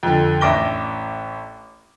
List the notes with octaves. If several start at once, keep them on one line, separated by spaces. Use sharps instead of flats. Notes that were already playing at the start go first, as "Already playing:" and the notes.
F2 D3
A1 D4 E5 D6 A#6 G7